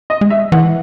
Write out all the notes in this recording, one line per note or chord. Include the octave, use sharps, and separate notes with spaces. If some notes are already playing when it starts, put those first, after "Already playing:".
D#5
G#3
E5
E3 F#5